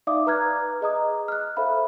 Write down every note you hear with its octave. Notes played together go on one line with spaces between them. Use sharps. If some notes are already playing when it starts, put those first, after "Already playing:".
D#4 D5 E5 F5 D6 D#6
B4 A#5 D6 F6 F#6 G#6
G#4 D#5 A#5 D#6
F6 F#6
A4 C5 E5 F5 B5